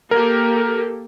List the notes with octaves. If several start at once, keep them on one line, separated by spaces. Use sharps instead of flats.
A#3 G4 A4 A#4